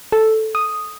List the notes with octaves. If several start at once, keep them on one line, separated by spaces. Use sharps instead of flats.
A4
D#6